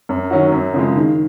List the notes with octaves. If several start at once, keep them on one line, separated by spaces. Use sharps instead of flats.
F#2
D#3 F#3 C#4 F#4
F#2
C#3 F3 G#3
D#3